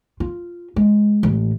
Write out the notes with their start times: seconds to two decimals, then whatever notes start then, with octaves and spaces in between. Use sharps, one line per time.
0.20 F4
0.76 G#3
1.23 A1 E3